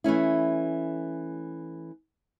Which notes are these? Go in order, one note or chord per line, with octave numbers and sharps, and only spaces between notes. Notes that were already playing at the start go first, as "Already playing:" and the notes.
E3 A3 C#4 E4